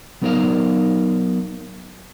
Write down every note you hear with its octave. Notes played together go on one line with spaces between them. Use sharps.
F#3 B3 D#4 A#4 D5 F5